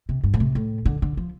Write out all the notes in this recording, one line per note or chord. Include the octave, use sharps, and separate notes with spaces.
C3
G2
A2
C3
A2
D3
D3
F3